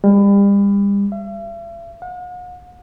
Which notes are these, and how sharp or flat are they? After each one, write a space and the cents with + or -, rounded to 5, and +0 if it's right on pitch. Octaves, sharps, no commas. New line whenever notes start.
G3 +35
E5 +45
F#5 -45